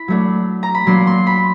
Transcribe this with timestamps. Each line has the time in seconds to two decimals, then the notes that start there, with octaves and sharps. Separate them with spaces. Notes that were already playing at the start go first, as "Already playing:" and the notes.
Already playing: E4 B5
0.08 F#3 A3 D4
0.63 A#5
0.74 B5
0.87 F#3 A#3 D4 C6
1.07 C6
1.27 B5